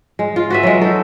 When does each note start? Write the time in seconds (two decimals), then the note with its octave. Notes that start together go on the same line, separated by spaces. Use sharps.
0.19 G#3
0.36 F4
0.50 F#4 B4 E5
0.63 F#3 G#3
0.82 D#4 A4